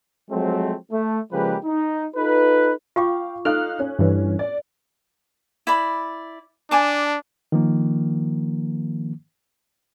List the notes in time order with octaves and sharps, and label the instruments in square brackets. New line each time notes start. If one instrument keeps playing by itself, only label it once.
[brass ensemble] F3 F#3 G#3 A3 C4
A3
C#3 F3 G#3 A#3 G4 B4
D#4
D#4 F4 A4 B4
[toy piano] F4 C#6 D6 [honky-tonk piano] F5 G5
[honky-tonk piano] D#4 F5 F#6 [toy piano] A4 [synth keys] F6
[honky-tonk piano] C#4
[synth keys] G2 E3
[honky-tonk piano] D5
[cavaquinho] E4 D5 B5
[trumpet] D4 [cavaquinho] G#5 A5 D6
[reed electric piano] D#3 F3 A#3